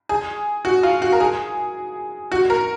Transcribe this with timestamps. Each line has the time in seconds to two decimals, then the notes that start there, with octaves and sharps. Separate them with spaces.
0.09 G#4
0.65 F#4
0.83 F4
1.02 F#4
1.12 A#4
1.20 G#4
2.32 F#4
2.50 A#4